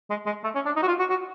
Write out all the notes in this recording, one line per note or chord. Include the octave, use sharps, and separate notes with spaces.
G#3
G#3
A3
C#4
D4
D#4
F#4
F4
F#4
F#4